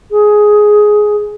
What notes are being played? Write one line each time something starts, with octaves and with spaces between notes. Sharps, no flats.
G#4